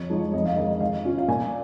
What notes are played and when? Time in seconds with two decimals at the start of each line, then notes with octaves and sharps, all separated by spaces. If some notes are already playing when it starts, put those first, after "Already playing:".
Already playing: F2 C#5
0.10 F3 G#3 D#4
0.34 F2 D#5
0.46 F5
0.57 D#3 G#3 D#5
0.80 D#3 F5
1.05 C#4 F4
1.18 F5
1.28 A#2 G#5